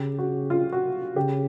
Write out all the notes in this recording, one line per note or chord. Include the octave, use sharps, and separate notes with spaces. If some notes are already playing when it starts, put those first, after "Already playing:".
Already playing: C#3 G4
F#4
F4
F#4
C#3 G4